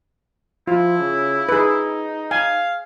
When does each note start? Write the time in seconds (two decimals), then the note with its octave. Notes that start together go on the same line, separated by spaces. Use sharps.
0.68 F3 E4 F4
0.99 C#3
1.49 D#4 G#4 B4
2.31 F5 G#5